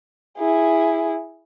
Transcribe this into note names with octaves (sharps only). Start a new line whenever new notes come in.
E4 G#4